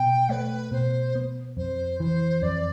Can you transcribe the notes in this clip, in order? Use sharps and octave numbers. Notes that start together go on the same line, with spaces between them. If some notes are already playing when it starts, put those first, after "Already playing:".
Already playing: B2 G5
A3 B4
B2 C5
B3
F2 C5
E3 C5
F2 D5